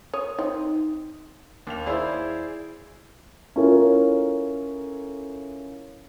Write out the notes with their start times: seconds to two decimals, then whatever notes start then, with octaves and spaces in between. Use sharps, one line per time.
0.14 C#5 D#6
0.39 C4 D#4
1.67 D#2 F5 F7
1.86 E4 G#4 C5 D5 E5
3.56 C#4 E4 F4 A4 A#4